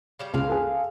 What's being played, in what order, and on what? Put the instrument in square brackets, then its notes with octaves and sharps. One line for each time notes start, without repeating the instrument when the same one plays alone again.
[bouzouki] C#3 G3 G4
[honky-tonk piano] C#2 [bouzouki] G#3 D4 F5
[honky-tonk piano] G#4 A4